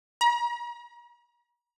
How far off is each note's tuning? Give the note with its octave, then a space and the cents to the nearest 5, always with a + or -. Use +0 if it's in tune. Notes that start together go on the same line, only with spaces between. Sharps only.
A#5 +45